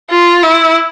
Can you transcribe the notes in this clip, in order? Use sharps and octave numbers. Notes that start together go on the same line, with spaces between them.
F4
E4